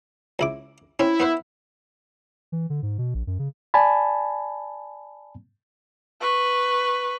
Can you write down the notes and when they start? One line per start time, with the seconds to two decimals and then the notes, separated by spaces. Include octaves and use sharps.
0.39 C#2 E4 D6
0.99 C4 C#4 E4
1.20 B3 B4 C5
2.52 E3
2.70 D3
2.83 G#2
2.98 B2
3.14 A#1
3.27 F#2
3.39 C#3
3.74 D5 G#5 A5 B5
6.21 B4 C#6